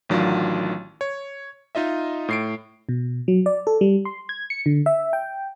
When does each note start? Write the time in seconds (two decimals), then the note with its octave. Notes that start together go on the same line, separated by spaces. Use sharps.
0.09 A1 D#3 F#3 D4 F4
1.01 C#5
1.75 D#4 F4 D#5 E5
2.28 A2 C7 D7
2.89 B2
3.28 F#3
3.46 D5
3.67 A4
3.81 G3
4.05 C6
4.29 G#6
4.50 C#7
4.66 D3
4.86 E5
5.13 G5